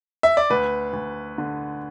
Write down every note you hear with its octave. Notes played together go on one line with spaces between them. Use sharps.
E5
D5
D2 B4
D2
D3